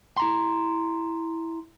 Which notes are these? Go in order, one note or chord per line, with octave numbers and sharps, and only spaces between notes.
E4 A#5 C6